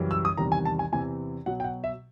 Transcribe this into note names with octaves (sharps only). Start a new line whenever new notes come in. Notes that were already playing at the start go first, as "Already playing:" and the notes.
Already playing: F#2 C#3 E3 G3
E6
D#6
E2 C3 D#3 G3 A#5
G#5
A5
G#5
E2 C3 E3 G#5
B2 F#3 F#5
G5
F#5
E5